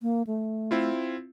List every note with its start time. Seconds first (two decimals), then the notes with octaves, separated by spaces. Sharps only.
0.02 A#3
0.27 A3
0.71 C4 E4 F4